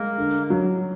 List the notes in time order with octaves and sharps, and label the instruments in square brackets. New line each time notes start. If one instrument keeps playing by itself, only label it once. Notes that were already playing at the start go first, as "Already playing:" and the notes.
Already playing: [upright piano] G#3 [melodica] A#3 A#4
[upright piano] D3
F#3